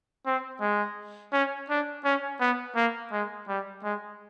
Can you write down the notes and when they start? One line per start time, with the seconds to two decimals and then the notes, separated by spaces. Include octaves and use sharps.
0.26 C4
0.61 G#3
1.33 C#4
1.70 D4
2.04 C#4
2.40 B3
2.76 A#3
3.12 G#3
3.48 G3
3.83 G#3